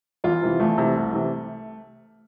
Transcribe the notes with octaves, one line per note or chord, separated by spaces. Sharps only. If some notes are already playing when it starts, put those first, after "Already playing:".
E2 F4
C3 E3
E2 A3
C3 E3
C2
C3 E3